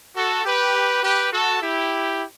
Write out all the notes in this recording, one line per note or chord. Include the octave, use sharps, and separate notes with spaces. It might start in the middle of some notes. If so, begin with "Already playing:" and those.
F#4 A4
G4 B4
G4 B4
F#4 A4
E4 G4